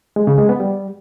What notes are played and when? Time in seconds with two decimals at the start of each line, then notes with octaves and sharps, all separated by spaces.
0.16 G#3
0.27 C#3
0.38 G#3
0.49 B3
0.60 G3